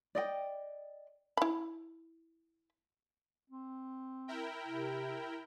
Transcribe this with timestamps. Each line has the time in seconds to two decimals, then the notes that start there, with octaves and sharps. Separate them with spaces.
0.15 D5 D#5 G5
1.37 E4 B5
3.50 C4
4.28 E4 A#4 G5
4.68 C3